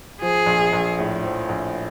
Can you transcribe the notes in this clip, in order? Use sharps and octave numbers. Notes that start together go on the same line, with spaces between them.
F3 G#4
A#1
A#1
A2
F3
A#1